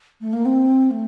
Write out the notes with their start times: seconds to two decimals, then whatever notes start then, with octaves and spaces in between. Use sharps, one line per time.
0.20 A3
0.32 A#3
0.45 C4
0.90 A3